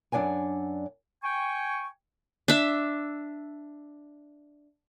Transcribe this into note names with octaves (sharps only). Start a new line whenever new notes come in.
F#2 D4 D5 F#5 G#5
G5 G#5 C#6
D4 E5